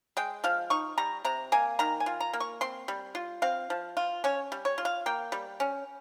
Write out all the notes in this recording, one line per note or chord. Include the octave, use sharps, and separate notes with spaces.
G#3 G5
F3 F5
D#4 C#6
G3 A#5
C3 A#5
A#3 G#5
D#3 A#5
G#5
F4
A#5
A#3
C#6
C4 C6
G3
F4
C4 F5
F3
F4
C#4 C#5
G3
C#5
F4
F5
A#3 G5
G3
C#4